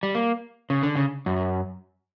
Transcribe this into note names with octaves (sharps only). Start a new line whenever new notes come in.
G3
A#3
C#3
D3
C#3
F#2